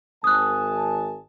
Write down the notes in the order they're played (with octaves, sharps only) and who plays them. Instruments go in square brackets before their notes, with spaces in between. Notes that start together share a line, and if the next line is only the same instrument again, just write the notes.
[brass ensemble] G#1 G#5 A5 [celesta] D#6 F#6